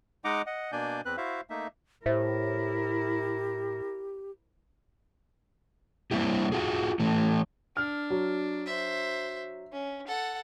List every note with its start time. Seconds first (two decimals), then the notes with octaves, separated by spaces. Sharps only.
0.24 G#3 D#4 D#5 F#5 A#5 D6
0.46 D#5 F#5
0.72 B2 A#3 D4 D5 G#5 G6
1.05 E2 C4 B4 F#6
1.17 E4 F#4 C5 E5 F5
1.50 A3 A#3 D#4 E5
2.06 A2 E4 G4 A#4 C5 E5
6.11 G3 A#3 C4 E4 G4
6.52 F4 F#4 G#4
7.00 E3 A3
7.77 D4 F6
8.10 F#3
8.67 C5 E5
9.72 C#4
10.07 A4 F#5